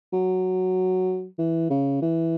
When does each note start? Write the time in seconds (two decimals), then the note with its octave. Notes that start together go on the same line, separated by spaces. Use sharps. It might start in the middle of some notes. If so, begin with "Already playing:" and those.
0.13 F#3
1.39 E3
1.70 C#3
2.02 E3